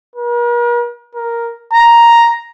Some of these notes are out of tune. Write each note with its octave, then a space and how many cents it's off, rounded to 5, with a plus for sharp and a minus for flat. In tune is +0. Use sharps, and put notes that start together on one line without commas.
A#4 +45
A#4 +0
A#5 +5